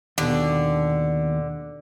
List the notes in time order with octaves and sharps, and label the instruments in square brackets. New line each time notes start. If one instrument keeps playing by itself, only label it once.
[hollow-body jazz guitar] D#2 B2 [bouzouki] D3